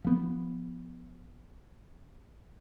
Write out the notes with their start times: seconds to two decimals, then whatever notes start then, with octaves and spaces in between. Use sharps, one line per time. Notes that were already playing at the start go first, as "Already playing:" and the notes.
0.05 F3 B3